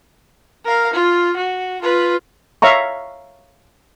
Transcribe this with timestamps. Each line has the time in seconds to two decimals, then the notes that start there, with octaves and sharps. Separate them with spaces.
0.65 A#4 F5
0.93 F4
1.36 F#4
1.82 F4 B4
2.62 C#5 E5 F5 A#5 C#6